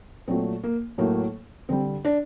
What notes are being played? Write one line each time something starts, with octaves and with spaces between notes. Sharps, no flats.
A#2 F#3 A3 C4
A#3
A2 F#3 A3 A#3
D3 G3 C4
D4